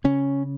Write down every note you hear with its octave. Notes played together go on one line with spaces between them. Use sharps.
C#3 C#4